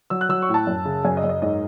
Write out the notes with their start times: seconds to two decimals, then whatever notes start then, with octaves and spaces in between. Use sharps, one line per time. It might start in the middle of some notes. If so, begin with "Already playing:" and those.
0.10 F#3 E6
0.21 F#6
0.29 F#3 E6
0.42 C#6
0.49 A2
0.54 A5
0.67 F#2
0.85 C#3
1.05 F#2 G#5
1.17 D#5
1.24 F#2
1.29 D#5
1.42 G#2 D#5